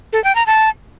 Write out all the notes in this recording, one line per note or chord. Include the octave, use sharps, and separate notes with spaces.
A4
G5
A#5
A5